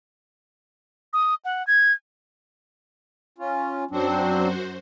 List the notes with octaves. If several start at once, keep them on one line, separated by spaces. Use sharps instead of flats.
D#6
F#5
G#6
C#4 F4
F#2 F#3 C4 D4 F#4 C5